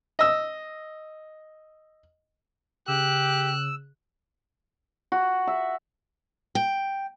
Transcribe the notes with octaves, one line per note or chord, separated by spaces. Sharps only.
D#5 E6
C#3 G4 E6 F#6
F#4
E5
G5